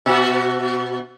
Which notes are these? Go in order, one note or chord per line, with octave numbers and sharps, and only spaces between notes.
B2 F#4